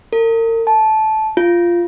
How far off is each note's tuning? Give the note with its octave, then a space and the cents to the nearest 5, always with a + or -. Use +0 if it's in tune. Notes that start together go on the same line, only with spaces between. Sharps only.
A#4 -40
A5 -15
F4 -10